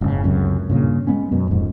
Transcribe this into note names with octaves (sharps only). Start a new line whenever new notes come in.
F#1 G#2 C#3
C#2 F#2 C3
G2 A#2 C#3 A#3
G#3 B3 C#4
F#2 B2
D#1 F2 G#2